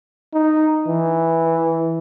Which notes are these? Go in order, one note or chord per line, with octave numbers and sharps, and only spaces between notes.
D#4
E3